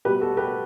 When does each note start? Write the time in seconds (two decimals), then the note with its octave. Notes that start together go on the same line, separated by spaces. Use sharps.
0.05 B2 G3 G4 B4
0.21 F#4 A4
0.37 G4 B4